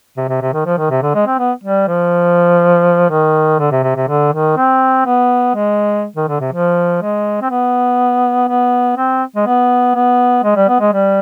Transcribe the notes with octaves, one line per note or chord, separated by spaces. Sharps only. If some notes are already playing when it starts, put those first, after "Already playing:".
C3
C3
C3
D#3
F3
D#3
C3
D3
G#3
C4
B3
G3
F3
D#3
D3
C3
C3
C3
D3
D#3
C4
B3
G#3
D#3
D3
C3
F3
G#3
C4
B3
B3
C4
G#3
B3
B3
G#3
G3
B3
G#3
G3